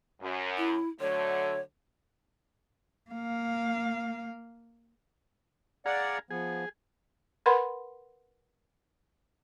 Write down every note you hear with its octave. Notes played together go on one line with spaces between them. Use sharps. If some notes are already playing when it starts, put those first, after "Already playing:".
F#2
E4
D3 F#3 A3 C#5
A#3 F5
G#4 D5 F5 F#5 A#5
F3 B3 G#4
A#4 B4 F#5 B5 C6